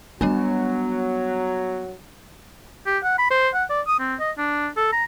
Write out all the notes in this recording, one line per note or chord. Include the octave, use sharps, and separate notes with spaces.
F#3 G3 B3 D4 G#5
G4
F#5
B5
C5
F#5
D5
D#6
C4
D#5
D4
A4
A#5